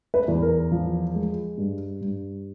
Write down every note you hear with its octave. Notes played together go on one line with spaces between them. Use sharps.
B4
E2
A#4
F3
G#3
G2
G2